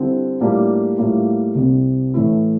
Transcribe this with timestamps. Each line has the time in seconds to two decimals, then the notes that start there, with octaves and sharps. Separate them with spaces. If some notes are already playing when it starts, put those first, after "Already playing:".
Already playing: D3 G3 C4 E4
0.40 A2 G3 A#3 D4 F4
0.98 A2 G3 A#3 F4
1.55 C2 C3 G3 C4
2.14 A2 E3 A3 E4